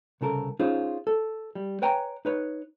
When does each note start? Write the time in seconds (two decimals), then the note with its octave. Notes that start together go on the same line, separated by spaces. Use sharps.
0.21 C2 C#3 A4 A#4
0.59 C#4 D#4 F4 G#4 C5
1.07 A4
1.55 G3
1.82 B4 C#5 G5 G#5 A#5
2.25 D#4 B4 C#5